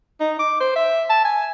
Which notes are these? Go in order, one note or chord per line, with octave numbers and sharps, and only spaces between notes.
D#4
D6
C5
E5
A5
G#5